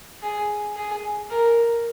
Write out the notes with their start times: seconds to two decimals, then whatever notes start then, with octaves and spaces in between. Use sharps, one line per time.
0.23 G#4
0.76 G#4
1.30 A#4